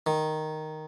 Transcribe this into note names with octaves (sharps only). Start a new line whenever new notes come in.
D#3